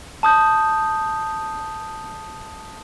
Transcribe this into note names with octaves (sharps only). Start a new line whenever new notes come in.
A5 D#6 G6